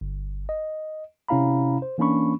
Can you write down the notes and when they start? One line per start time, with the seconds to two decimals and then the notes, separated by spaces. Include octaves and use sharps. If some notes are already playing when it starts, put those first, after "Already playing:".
0.01 G1
0.49 D#5
1.28 C3 C#4 E4 F5 A#5 B5
1.82 C5
1.98 E3 A#3 C#4 D4 B5 C#6